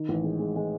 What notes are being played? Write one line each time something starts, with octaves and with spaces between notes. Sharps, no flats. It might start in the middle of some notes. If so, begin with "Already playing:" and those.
Already playing: D#3
A1
G#3
G#3
G#3